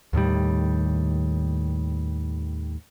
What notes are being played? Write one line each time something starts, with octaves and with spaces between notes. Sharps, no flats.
D#2 A2 D#3 G3